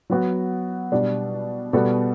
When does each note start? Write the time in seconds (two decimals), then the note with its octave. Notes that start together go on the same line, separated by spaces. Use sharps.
0.10 F#3 B3 F#4
0.92 B2 G3 D4
1.73 B2 G3 B3 F#4 A4